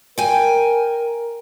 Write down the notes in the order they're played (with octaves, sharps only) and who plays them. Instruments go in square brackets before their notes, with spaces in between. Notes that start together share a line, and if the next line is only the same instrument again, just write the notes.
[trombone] A#4 [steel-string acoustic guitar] G5 G#5